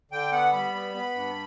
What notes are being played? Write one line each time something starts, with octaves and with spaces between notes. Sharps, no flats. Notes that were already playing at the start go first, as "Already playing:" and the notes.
D3 G5
B3 F#5
G3 B5
B3
B3
G2